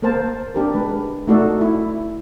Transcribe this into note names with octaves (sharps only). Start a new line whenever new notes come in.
A#3 A#4 C5 A5
D4 G4 A#4
G#3 B4
A3 D#4 F#4 A4 D5
E4